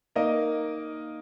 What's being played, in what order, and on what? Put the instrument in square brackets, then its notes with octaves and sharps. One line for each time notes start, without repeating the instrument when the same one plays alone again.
[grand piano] A#3 D#4 A#4 D#5